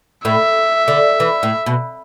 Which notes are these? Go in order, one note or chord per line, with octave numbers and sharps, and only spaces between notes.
A2 E5
D3
E3
A2
B2